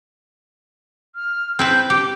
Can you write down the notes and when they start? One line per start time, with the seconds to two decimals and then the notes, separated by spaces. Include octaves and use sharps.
1.15 F6
1.59 C4 E4 B4 G6
1.90 G4 D6